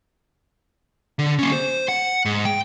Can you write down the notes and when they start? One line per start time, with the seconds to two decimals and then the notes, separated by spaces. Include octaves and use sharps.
1.19 D3
1.39 A#3 C#4
1.52 C5
1.88 F#5
2.25 G#2
2.45 G5